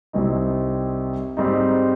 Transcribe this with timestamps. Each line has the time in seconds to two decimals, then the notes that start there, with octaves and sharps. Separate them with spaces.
0.13 C2 C3 G3 C4 D#4
1.37 G#2 G3 C4 D#4